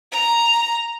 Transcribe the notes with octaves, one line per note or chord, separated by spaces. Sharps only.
A#5